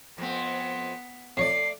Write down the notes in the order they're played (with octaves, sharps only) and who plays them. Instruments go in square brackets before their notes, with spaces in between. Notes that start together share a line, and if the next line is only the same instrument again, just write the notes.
[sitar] F2 C4 [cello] B3
[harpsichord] F2 C#5 [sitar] A3 D5 [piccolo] C7